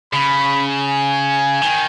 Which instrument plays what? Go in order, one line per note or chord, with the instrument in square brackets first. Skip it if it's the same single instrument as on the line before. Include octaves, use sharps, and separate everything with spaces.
[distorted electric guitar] C#3 [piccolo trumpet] B5
[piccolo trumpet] G#5
[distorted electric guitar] D#3